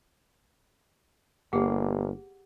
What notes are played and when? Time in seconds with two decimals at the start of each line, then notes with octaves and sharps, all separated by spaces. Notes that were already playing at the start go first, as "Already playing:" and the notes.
1.53 G1 A#3 G4 G#4 F#5